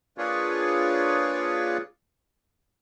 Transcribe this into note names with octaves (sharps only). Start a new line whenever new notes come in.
A#3 D4 F4 G#4 B4 C#5